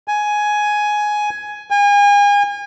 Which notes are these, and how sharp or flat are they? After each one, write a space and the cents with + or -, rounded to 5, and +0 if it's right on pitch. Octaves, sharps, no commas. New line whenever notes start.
G#5 +10
G#5 -35